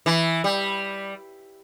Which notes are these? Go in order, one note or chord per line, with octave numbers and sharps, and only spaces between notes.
E3
G3